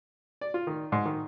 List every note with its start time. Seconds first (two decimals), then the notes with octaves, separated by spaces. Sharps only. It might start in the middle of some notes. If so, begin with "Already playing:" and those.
0.41 D5
0.54 F4
0.67 D#3
0.92 G#2
1.06 D#3